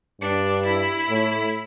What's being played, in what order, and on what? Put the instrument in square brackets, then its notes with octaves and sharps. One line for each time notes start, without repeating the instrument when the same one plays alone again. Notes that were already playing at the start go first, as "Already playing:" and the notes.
[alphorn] G2 [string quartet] D4
[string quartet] E4
[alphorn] A2